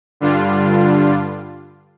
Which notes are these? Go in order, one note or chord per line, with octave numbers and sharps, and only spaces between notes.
G2 D3 G3 D4 F4